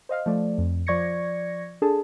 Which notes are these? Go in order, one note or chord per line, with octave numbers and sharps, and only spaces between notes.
C5 D#5 F5 F6
F3 A3 D5
F2
F3 D5 C#6 G#6 A#6 C#7
D4 G#4 A4 A5